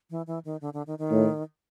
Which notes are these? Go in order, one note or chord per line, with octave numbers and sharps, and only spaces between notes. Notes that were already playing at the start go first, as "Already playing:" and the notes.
E3
E3
D#3
D3
D3
D#3
D#3
A2